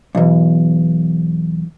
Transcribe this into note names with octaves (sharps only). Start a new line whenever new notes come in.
B1 E2